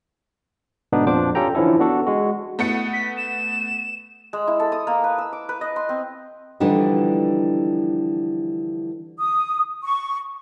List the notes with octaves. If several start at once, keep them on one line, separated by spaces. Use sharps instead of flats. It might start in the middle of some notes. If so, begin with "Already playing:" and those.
G#2 B2 D3 B3 D4 D#4
F2 A#2 F3 D4 C5 D6
C#4 F4 G4 A4 G5 A#5
D3 E3 F3 C#4 E4 A4
B3 D4 F#4 A4
G#3 F#4
A3 B3 C#7
B6
E7
G#3
E4
A4
D#6
A#3
B4
E6
D6
B4
D#5
C6
C4
D3 E3 F3 G3 D4 D#4
D#6
C#6